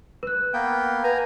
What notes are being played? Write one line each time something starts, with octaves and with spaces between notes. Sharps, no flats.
B4 F#6
A#3 B3 G5
B4 G#5 A#5